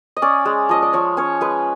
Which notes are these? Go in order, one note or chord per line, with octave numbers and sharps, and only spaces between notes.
D#5
C#4 D5
G#3
F3 D#5
D5
F3 C#5
C#4 C#5
G#3 B4